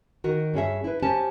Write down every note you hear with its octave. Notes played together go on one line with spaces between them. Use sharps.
D#3 F#4 A#4
G2 C#4 G#4 E5
E4 B4
C#4 G4 C5 A5